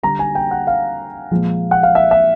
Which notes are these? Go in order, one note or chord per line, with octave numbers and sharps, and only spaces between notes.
D3 G3 A#5
G#5
G5
F#5
F5
A#2 F3 G#3
F#5
F5
E5
E5